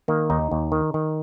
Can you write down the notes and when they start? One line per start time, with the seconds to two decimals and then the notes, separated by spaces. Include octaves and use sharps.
0.08 D#3 A#3
0.30 D#2 D#4
0.51 D#2
0.72 D#3
0.94 D#3